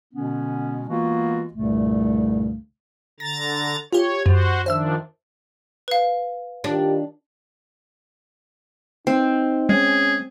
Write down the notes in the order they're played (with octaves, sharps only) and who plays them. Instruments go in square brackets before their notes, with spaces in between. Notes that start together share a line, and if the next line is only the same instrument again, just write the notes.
[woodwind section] B2 D3 G#3 B3 C#4
E3 G#3 A#3 B3 F4 F#4
C2 G2 A#2 C#3 A3
[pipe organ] D3 A#5 A6 [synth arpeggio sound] A#6
[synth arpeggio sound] F4 G4 [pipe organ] C#5
[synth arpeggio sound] F#2 [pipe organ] F#4 C5
[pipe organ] D#3 F3 D4 [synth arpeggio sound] C5 E5 E6
[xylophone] B4 F5
[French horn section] D#3 F4 G4 [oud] D4
[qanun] C4 [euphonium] D#4
[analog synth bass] G#3 [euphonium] C#4 [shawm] G#4